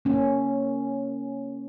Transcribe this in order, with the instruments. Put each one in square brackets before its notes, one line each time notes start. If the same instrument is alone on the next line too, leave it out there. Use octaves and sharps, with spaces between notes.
[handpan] A#3 C#4